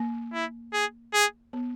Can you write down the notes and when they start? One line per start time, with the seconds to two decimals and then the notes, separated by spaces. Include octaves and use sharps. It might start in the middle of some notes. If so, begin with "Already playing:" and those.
Already playing: A#3
0.33 E4
0.73 G#4
1.13 G#4
1.53 B3